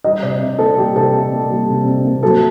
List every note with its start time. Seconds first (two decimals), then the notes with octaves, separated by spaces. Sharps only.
0.04 G3 D#5
0.22 C3 D5
0.41 C3
0.58 A#3 A4
0.77 G3 G4
0.95 C3 A4
1.13 C3
1.32 A#3
1.50 G3
1.69 C3
1.86 C3
2.04 A#3
2.22 F#3 A4